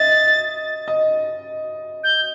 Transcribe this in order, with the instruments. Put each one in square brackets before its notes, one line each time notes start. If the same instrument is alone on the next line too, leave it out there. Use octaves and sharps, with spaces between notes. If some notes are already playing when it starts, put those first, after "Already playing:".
Already playing: [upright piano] D#5 E5 [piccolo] A6
[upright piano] D#5
[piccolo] G6